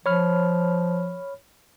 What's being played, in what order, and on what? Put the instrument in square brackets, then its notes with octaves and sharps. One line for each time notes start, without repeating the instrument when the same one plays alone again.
[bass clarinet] F3 [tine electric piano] C#5 B5 F6